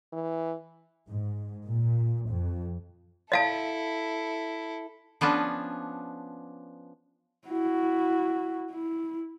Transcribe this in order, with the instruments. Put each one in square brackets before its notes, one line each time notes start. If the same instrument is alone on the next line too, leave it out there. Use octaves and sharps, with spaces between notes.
[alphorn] E3
[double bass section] G#2
A#2
F2
[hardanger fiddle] E4 A4 [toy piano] D#5 F5 A5
[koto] F3 B3 C#4 D4
[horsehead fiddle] E4 F#4
E4